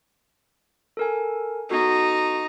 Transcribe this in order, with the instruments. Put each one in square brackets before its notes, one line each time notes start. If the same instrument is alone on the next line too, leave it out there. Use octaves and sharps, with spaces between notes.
[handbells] A4 A#4 G#5
[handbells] B3 F#4 A4 [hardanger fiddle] D#4